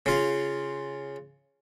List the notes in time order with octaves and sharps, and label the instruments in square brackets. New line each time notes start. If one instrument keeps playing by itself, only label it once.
[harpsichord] C#3 F4